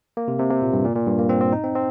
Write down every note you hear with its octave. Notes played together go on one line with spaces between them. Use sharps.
A#3
C3
C3
C3
A#2
G2
A#2
A#2
G2
A#3
C4
C4
D#4
C4
C4